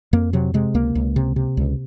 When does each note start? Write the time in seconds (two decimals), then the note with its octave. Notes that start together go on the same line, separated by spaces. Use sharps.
0.13 F2 A#3
0.33 C3 F#3
0.54 C3 G#3
0.74 C#2 A#3
0.95 C#2
1.16 C3
1.36 C3
1.57 C#2